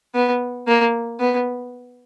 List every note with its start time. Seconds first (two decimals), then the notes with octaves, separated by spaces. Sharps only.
0.15 B3
0.67 A#3
1.20 B3